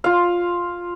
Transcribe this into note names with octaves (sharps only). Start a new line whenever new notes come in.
F4 F5